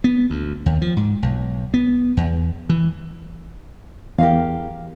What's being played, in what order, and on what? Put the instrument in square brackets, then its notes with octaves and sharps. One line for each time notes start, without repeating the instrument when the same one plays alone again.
[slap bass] B3
D2
D#2
F3
G#2
B1
B3
E2
E3
[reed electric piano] E2 [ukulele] G4 A#4 F5